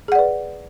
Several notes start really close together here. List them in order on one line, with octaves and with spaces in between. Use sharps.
G#4 F#5 D5 B4